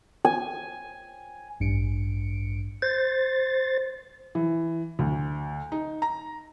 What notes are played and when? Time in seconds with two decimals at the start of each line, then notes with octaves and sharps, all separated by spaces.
0.25 G#5
1.60 A1 G2 C#7 D7
2.82 C5 A6
4.35 E3
4.99 D2
5.72 D#4
6.02 A#5